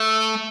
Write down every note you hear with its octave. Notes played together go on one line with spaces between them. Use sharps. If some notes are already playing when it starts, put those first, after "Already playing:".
Already playing: A3